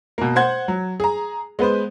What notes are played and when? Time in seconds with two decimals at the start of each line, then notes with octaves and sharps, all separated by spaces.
0.18 B2 A#3
0.36 C5 F#5 G#6
0.68 F#3
1.00 G#4 A#5
1.59 G#3 B3 B4 C5